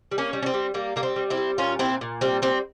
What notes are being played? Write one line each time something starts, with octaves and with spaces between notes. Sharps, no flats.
G3
A#3 C#4
G3
C#4
C4
G3
G3 A#3
G3 A#3
C4
G3
C4 E4
G3
A#2 C#4 F4
A#2 C4 E4
A#2
G3 C4
G3 C4